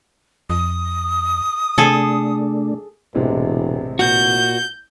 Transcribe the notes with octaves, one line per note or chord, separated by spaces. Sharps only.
F2 D#6
C3 A3 D4 G#4 A4
E1 A1 C3 G#3
A#2 F#4 G6